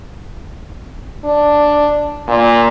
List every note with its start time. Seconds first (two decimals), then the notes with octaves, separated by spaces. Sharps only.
1.25 D4
2.28 A#2